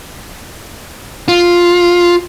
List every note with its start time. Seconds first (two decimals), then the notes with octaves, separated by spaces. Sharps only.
1.28 F4